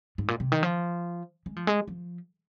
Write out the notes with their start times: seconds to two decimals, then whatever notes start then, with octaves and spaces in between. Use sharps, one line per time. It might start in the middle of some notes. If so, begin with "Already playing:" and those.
0.18 G#2
0.28 A#2
0.40 C3
0.52 D#3
0.63 F3
1.46 G#3
1.56 F3
1.67 G#3
1.88 F3